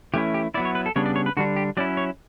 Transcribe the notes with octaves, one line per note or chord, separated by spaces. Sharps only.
E3 A3 C#4 E4 G4
G4
F#3 B3 E4 D5
C#5
B4
A4
C#3 G3 B3 D4 C#5
D5
C#5
B4
D3 G3 D4 F#4
G4
F#3 C#4 E4 D5
C#5